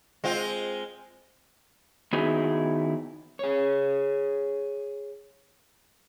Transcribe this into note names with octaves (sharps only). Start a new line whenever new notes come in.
G#3 C4 F4
D#3 B3 D#4 E4 F#4 G#4
G#4 C#5